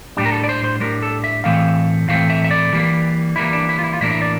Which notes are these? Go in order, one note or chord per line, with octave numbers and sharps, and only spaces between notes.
A2 G3 D4 G4
A#4
A4
D5
C5
C5
A2 G3 D4 A#4
A4
E5
A2 E3 A3 C4 F5
A2 E3 A3 C4 F5
E5
E5
D5
E3 G3 A#3
E3 G3 A#3 E4
D4
E4
F4
E4
F4
A2 E3 A#3 D4 E4
E5
D5